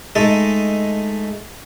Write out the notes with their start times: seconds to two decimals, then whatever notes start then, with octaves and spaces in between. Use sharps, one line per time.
0.15 G#3 A3 D#4 A4